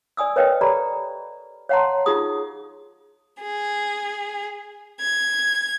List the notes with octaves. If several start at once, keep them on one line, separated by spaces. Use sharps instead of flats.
D5 G#5 D#6 E6
A#4 B4 C#5 D#5 F5 G5
G4 A4 B4 D5 A#5 B5
C#5 F5 F#5 A5 A#5 C6
D#4 F4 G4 G#4 D#6
G#4
G#6